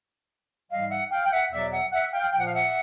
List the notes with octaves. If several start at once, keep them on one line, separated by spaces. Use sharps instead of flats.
G#2 E3 G3 D#5 F5
E5 F#5
F5 G5
G5
E5 F#5
E2 B2 F#3 D5 E5
E5 F#5
E5 F#5
F5 G5
A#2 F3 G5
F#5
F5
E5 F#5